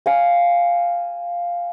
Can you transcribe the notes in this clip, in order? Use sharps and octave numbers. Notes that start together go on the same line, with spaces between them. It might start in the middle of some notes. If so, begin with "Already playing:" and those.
F5 G#5